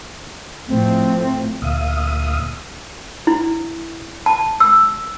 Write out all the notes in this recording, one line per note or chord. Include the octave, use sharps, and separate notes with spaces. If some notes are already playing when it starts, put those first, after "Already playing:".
A2 F3 A3 C4
D2 A#2 E5 F5 D#6
E4
A5
E6